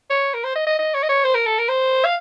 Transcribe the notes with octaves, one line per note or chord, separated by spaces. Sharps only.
C#5
A#4
C5
D#5
D#5
D#5
C#5
D#5
C#5
C5
A#4
A4
A#4
C5
F5